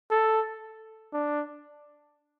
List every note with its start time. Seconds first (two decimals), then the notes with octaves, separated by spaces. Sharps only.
0.11 A4
1.13 D4